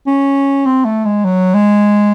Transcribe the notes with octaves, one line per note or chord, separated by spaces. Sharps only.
C#4
C4
A3
G#3
F#3
G#3